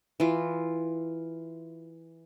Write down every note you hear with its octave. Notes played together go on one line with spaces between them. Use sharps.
E3 F4